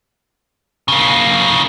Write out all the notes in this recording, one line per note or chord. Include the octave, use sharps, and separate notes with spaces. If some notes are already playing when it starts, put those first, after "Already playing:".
C#3 A#3